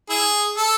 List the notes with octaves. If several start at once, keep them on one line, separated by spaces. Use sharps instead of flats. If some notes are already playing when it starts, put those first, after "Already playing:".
E4 G#4
A4